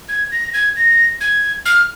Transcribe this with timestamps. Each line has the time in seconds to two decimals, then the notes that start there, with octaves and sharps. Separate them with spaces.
0.09 G#6
0.32 A#6
0.54 G#6
0.76 A#6
1.21 G#6
1.66 F6